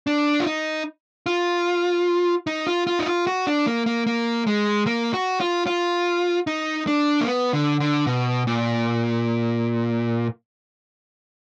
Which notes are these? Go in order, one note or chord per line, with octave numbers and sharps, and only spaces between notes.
D4
F4
D#4
F4
D#4
F4
F4
D#4
F4
F#4
D4
A#3
A#3
A#3
G#3
A#3
F#4
F4
F4
D#4
D4
A#3
B3
D3
D3
B2
A#2